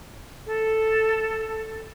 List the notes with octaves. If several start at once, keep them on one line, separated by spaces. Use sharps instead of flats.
A4